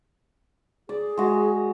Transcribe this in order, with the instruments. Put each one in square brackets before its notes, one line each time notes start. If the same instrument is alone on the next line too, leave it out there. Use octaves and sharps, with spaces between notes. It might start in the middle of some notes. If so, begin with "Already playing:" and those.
[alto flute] G#4 [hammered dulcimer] D5
[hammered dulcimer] G#3 F#4